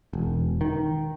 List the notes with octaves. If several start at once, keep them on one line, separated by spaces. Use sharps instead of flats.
E1
D#3